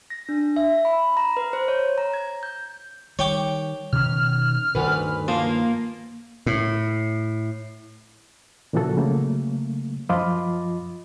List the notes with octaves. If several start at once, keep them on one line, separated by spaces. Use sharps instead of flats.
A#6
D4
E5
B5
A#5
B4
C5
C#5
A#5
G#6
G6
D#3 G3 C#5 G5 D6
B2 D#3 C#4 F6
D2 G2 D#3 B4
F3 A#3
A2
A#2 C#3 E3 F3 F#4 A4
C#3 F#3 A3 A#3
F#2 F3 F4 D#5 B5 D6